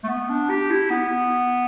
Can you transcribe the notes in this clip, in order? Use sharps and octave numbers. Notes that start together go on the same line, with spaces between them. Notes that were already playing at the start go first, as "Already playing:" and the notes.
A3
B3
D4
G4
E4
B3